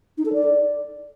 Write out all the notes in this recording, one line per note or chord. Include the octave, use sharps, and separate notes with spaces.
D#4
A4
D5